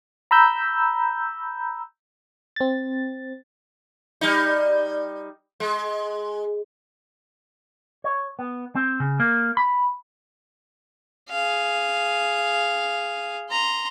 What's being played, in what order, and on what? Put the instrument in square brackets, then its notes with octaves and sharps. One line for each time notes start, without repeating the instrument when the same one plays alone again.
[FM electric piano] A#5 B5 E6 G6
C4 A6
[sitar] G3 D#4
G#3
[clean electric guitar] C#5
B3
C4
C#3
A#3
B5
[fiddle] G#4 F5
A#5 C6